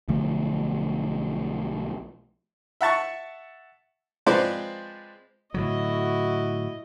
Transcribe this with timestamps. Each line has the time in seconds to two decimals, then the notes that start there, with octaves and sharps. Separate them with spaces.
0.08 B1 D3 F3 A3
2.81 E5 F#5 A5 C#6
4.26 F3 G#3 C4 B4 C5 D5
5.54 A2 D3 F#3 E4 F#4 D#5